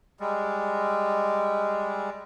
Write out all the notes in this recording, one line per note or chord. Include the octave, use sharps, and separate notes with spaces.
G3 G#3